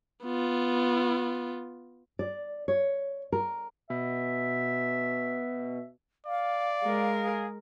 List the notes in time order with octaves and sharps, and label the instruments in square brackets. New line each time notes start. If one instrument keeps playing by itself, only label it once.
[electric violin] B3 F4
[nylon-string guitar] D5
C#5
A#4
[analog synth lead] B2 [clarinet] E5
[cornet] D5 [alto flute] F5
[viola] G#3 A#4
[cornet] G#4